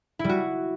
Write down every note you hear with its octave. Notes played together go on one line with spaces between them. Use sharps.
E4
G3
F#4